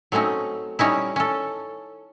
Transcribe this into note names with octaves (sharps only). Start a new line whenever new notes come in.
F#3 A3 C4 C#4 D#4
G3 C#4 D#4 E4
C#4 A4